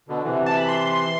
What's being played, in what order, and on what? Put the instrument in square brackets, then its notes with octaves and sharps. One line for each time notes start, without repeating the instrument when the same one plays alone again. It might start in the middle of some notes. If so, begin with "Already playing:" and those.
[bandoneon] B2 D3
C3 E3
[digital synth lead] A5
B5
C6